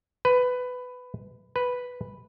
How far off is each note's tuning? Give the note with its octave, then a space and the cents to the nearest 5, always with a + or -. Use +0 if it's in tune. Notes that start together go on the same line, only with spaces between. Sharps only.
B4 +15
B4 +0